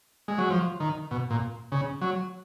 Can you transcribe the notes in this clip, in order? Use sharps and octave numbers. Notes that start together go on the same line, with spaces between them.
G#3
F#3
F3
D#3
B2
A#2
C#3
F#3